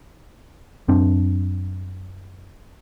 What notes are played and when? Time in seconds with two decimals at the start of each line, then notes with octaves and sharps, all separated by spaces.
0.88 F#2 C4 D4